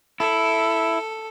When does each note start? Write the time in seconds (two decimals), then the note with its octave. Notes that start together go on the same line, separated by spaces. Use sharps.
0.20 E4 A4